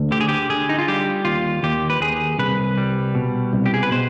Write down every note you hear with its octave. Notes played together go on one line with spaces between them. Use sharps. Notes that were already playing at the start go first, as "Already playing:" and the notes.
Already playing: D2
D3 G4
G#4
G4
D3 G#4
D#4
F4
G3 G4
D#2 F4
D#2 G4
B4
D#2 G#4
C2 B4
G3
B2
C2
G4
G#4
B4
B2 C5